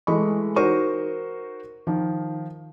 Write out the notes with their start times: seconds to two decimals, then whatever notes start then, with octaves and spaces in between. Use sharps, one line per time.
0.07 E3 G#3 A3 D#5 B5 C#6
0.56 D#4 F#4 A#4 C5 C#6 D#7
1.87 D#3 F3